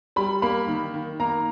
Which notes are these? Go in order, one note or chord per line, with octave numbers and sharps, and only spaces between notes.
G3 B5
A#3 B5
D#3
D#3
A#3 A#5